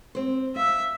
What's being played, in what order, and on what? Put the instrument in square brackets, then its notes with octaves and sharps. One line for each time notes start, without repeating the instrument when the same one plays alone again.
[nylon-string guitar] C4 C5
[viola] E5 [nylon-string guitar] F5